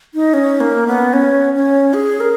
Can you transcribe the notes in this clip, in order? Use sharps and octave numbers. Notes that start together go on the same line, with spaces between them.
D#4
C#4
A#3
B3
C#4
C#4
G#4
A#4